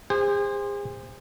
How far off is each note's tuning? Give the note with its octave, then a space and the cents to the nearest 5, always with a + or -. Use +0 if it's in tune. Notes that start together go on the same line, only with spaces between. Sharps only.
G#4 -40 C5 +0